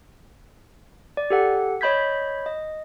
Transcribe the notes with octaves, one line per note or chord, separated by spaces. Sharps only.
D5
G4 A4 F#5
C#5 D#5 B5 G6 G#6 B6
D#5